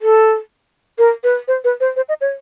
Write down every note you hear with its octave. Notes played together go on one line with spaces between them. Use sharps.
A4
A#4
B4
C5
B4
C5
C5
D#5
C#5